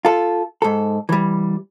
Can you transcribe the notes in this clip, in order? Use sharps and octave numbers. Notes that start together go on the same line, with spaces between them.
F4 A4
G#2 A4
E3 G3